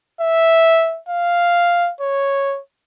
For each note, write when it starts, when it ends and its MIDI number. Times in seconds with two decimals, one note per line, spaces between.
0.21 0.99 76
1.09 1.91 77
2.01 2.60 73